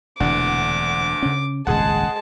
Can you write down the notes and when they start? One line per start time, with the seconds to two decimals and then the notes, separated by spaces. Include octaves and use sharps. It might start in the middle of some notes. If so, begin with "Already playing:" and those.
0.20 E1 D2 C3 E3 D4 F#5 D6
1.23 C#3 C#4
1.67 D#1 G#1 C#2 G#3 G#4 F#5 A5